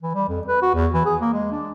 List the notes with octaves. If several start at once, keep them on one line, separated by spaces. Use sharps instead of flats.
E3
G3
F2
B4
F#4
E2
E3
G#4
A#3
G#3
D4